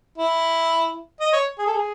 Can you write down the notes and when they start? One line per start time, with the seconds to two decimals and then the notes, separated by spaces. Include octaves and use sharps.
0.18 E4
1.20 D#5
1.33 C#5
1.59 G#4
1.66 A4
1.73 G#4